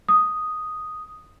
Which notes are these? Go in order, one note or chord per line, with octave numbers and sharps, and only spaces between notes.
D#6